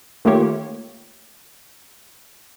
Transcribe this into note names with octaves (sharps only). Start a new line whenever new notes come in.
D#3 A3 A#3 F4 G4 C#5